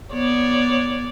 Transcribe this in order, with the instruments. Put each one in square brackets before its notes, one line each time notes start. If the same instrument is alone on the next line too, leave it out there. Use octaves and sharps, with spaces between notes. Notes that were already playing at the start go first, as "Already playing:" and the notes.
[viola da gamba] B3 C#5 D5